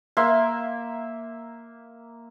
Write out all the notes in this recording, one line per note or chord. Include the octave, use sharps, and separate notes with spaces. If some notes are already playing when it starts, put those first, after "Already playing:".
A#3 E5 C6